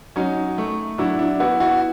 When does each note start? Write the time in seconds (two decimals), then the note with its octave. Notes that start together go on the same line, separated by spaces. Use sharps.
0.16 F#3 C#4 D#4
0.58 A3
0.98 F#3 D4 E4
1.19 D4 E4
1.40 B3 E4 F#4
1.60 E4 F#4